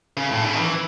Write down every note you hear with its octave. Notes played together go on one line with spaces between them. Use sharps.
C#3
A2
C#3
D#3
E3